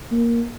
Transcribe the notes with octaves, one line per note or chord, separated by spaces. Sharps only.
A#3